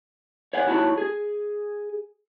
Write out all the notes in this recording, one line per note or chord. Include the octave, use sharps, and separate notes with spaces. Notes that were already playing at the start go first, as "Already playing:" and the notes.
C#5 F5 F#5 G#5
D#2 E4 F#4 C#5 A5 B5
G#4